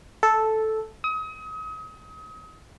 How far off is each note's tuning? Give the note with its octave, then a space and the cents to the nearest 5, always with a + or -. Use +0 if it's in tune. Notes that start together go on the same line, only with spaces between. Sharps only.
A4 -5
D#6 +35